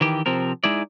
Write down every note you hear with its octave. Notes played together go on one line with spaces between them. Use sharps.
D#3 E3 G4
C3 F3 C4 A#4
G#3 D#4 E4 D5